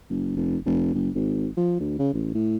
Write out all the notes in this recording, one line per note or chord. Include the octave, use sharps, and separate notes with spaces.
F#1
F1
F1
F#1
G#1
F3
D2
C#3
A1
A2